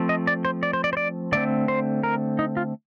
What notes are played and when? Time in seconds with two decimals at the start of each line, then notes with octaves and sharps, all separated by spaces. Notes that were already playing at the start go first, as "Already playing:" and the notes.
Already playing: F3 A3 C4
0.09 D#5
0.27 D5
0.45 C5
0.63 D5
0.73 C5
0.84 D5
0.93 C5
0.97 D5
1.32 D3 A3 C4 D5
1.68 C5
2.03 A#4
2.39 D#4
2.57 F4